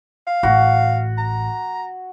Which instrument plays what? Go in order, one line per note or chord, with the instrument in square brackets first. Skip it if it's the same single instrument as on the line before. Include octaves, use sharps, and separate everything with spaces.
[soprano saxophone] F5
[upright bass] A1 [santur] F#4
[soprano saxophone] A#5